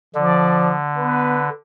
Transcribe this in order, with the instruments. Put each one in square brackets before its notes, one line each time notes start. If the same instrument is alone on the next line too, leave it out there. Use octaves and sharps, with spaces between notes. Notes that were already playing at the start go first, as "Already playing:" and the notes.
[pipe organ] D3 [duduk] F3 [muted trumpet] D5
[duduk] B3 [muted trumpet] B4